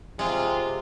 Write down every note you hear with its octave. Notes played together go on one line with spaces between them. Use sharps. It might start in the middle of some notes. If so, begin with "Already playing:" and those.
C3 G#3 F4